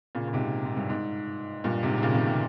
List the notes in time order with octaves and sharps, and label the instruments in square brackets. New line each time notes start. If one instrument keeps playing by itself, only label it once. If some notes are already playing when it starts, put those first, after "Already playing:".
[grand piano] A#2 C#3
A#2
G#2 C3
G#2
G2
G#2
G2 A#2
G#2 C3
C3
A#2 C#3
C3 D#3
C3